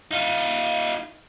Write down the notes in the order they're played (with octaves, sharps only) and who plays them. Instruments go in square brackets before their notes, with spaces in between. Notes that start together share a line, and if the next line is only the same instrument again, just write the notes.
[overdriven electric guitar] D#4 F4